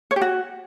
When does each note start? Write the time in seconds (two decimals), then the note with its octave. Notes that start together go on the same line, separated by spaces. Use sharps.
0.11 C#5
0.16 G4
0.21 F#4